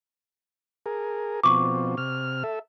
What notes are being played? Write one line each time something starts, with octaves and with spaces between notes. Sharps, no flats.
G#4 A#4
B2 F3 C4 C#6 D6
C3 F6
A4 E5